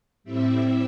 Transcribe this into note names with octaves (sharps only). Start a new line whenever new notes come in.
A2 G3 C4 E4 E5